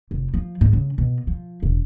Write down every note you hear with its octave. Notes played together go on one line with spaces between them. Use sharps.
F1
F3
G#2
C#3
B2
F3
E1